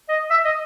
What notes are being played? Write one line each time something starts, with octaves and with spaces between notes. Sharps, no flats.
D#5
E5
D#5